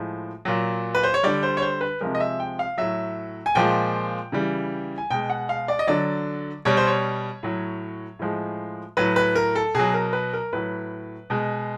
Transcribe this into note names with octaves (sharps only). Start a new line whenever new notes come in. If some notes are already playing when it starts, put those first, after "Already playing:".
Already playing: A2 F3 G#3
A#2 F#3
B4
C5
C#5
D3 G3 D5
C5
C#5
C5
B4
C3 F3 G#3 A#4
D#5
E5
G5
F5
A2 F#3 E5
G#5
A#2 F3 G#3 G5
C#3 E3 G3
G#5
B2 G#3 G5
F#5
F5
D5
D#5
D3 F#3 D5
B2 G3 C#5
C5
C#5
A2 F#3
A2 F3 G#3
A2 F#3 B4
B4
A#4
A4
B2 F#3 G#4
A#4
B4
A#4
A2 F#3 B4
B2 G#3